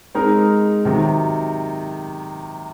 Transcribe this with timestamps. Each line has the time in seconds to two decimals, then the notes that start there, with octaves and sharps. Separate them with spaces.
0.15 G#3 C4 D#4 A#4
0.85 C3 D#3 F#3